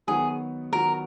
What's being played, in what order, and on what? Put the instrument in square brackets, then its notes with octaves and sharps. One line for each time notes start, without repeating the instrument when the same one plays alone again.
[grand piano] D#3 F#3 B3 F#4 [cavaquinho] G#4
[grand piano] D#3 F#3 B3 F#4 [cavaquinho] A#4